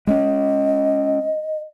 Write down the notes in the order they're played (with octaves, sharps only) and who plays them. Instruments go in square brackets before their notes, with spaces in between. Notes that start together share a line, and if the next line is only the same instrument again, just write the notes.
[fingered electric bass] G#3 A#3 C#4 [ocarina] D#5